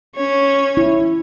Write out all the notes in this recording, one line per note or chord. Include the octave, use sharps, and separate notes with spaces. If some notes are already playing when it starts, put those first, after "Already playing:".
C#4 C#5
E4